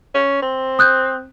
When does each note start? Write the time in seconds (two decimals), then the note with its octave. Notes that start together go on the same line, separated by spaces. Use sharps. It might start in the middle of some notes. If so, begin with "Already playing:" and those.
0.15 C#4
0.42 C4
0.79 D#6 F#6 G6